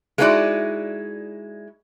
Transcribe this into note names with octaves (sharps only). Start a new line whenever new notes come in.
G#3 A#3 D#4 E4 F#4 D5